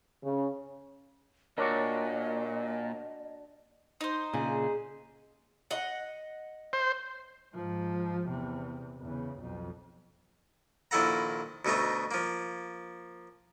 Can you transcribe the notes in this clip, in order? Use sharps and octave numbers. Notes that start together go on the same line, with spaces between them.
C#3
A#2 D4 F#4 A#4 C#5 D#5 D6
D#4 C5
A#2 C#3 G#4
D#5 F#5
C5
G#2 F3
E2 C3
E2 C#3
B1 F2
A#1 D#3 E4 A4 F#5 A#5
D2 B2 A3 D#4 A#5
F3 A#3